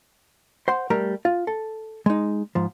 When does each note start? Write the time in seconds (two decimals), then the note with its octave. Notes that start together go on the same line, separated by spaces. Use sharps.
0.68 C5 F#5 C6
0.90 G3 A3 A#4 A#5
1.25 F4
1.47 A4
2.06 G#3 D#4
2.55 G#2 F3